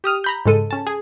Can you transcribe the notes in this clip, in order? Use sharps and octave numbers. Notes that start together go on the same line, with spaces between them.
G4 D#6 F6
A#5 B5 G6
G#2 C#3 G#3 A4 D#7
C#4 A5
G#4